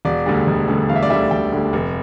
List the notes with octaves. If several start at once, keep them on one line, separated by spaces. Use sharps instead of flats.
E1 D5
D2 D3 G3
E1
D2 D3 G3
E1 F5
E5
D5
D2 D3 G3 E5
E1 G5
D2 D3 G3
F1